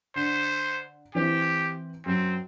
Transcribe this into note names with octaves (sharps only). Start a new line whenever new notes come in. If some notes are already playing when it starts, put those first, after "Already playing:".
D3 C5
E3 C4 E4 G4
F#2 C4